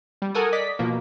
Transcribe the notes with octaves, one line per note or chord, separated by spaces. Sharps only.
G3
A4 A#4 F#5 G#5 C#6 D#6
D5 D#5 B6
B2 F3 A#3